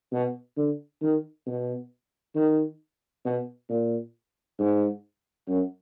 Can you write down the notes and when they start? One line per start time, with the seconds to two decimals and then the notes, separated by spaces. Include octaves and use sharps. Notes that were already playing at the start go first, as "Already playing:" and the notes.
0.11 B2
0.56 D3
1.01 D#3
1.46 B2
2.35 D#3
3.25 B2
3.69 A#2
4.59 G#2
5.48 F#2